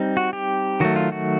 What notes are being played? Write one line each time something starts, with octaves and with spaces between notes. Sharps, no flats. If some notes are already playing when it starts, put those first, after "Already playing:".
Already playing: G3 C4 D#4
F#4
G4
D#3 F#3 A3 F#4
F4
F#4